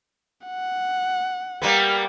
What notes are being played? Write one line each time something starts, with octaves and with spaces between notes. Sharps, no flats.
F#5
G3 A#3 B3